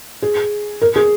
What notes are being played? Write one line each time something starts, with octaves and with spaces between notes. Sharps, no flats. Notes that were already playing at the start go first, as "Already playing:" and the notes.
G#4
A#4
G#4